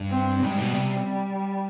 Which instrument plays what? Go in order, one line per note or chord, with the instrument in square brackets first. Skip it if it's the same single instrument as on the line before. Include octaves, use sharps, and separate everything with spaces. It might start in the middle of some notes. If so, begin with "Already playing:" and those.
Already playing: [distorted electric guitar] G2
[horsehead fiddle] C4
[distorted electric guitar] G#2 [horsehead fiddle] G3
[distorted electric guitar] B2
C3